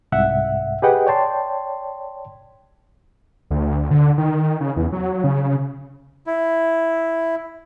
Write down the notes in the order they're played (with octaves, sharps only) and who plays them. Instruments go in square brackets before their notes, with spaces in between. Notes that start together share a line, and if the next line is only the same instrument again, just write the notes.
[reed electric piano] C2 G#2 E5 F#5
G4 G#4 B4 D#5 F#5 G5
C#5 D5 G5 A5 C6
[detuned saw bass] D2
D3
D#3
C#3
E2
F#3
C#3
[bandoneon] E4